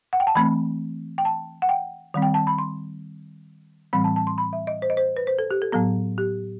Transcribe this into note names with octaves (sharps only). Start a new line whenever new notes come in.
F#5
G5
A5
E3 A3 C4 B5
G5
A5
F#5
G5
D#3 G3 C4
G5
A5
B5
C6
A2 E3 G3 C4 B5
A5
A5
C6
B5
E5
D#5
C5
D#5
C5
B4
C5
A4
G4
A4
A2 F#3 B3 A4
G4